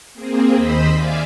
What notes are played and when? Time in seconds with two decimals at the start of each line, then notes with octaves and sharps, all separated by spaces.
0.14 A#3 C4 G#4
0.56 D#2 C5 D#5 B5 E6 B6
0.92 D5 E5 F5 G#5 D6